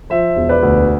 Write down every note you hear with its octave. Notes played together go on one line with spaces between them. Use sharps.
F3 C5 E5
E1
B4 D5
D2